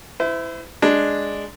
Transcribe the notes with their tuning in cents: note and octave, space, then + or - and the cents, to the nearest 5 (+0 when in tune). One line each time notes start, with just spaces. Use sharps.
E4 +0 C5 -40
G#3 +0 D4 +0